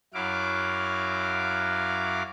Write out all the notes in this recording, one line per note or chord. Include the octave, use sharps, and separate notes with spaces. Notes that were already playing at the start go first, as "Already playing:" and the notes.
F#2 F#3 E4 F#4 F5 D6